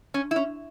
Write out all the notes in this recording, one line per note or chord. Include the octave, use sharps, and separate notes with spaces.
C#4
E4
C#4